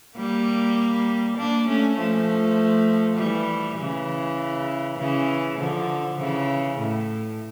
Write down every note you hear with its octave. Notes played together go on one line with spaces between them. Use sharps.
G3 A#3
A#3 D4
A3 C#4
F3 A3
E3 G3
C#3 E3
C#3 E3
D3 F3
C#3 E3
A2